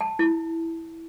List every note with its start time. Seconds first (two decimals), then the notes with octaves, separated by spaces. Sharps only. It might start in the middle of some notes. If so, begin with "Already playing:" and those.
0.01 A5
0.19 E4